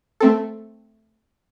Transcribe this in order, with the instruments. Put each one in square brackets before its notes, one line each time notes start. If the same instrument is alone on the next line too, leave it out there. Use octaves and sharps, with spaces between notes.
[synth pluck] A3 C4 A4